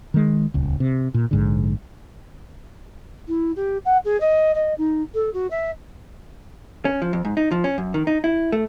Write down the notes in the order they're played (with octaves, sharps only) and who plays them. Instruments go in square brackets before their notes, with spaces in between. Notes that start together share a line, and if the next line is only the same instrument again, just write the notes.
[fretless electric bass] D#3 G#3
D#1 C#2
C3
A#2
A#1 G#2 D3
[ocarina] E4
G4
F#5
G#4
D#5
D#5
D#4
A4
F#4
E5
[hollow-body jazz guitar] C#4
F3
F2
G#2
D#4
F3
C#4
F#2
D#3
D#4
E4
A3